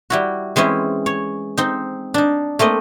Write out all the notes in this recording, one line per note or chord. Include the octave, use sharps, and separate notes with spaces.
G3 E4 F#4
E3 G#3 C4 C#4 E4
C#5
C4 D#4
D4 D#4
A3 A#3 C4 D#5